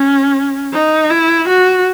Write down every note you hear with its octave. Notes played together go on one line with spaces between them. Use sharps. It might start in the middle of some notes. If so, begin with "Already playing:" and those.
Already playing: C#4
D#4
E4
F#4